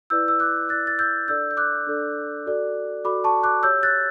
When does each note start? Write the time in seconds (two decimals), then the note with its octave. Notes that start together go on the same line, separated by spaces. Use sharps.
0.10 E4 B4 D5 E6 G6
0.28 E6
0.40 D6 F#6
0.69 E4 B4 D5 F#6 A6
0.87 A6
0.99 E6 G6
1.28 D4 A4 D5 E6 G6
1.51 G6
1.57 D6 F#6
1.87 D4 A4 D5
2.46 F#4 A4 D5
3.04 F#4 A4 D5 B5 D6
3.24 A5 C#6
3.43 D6 F#6
3.63 G4 C#5 E6 G6
3.83 F#6 A6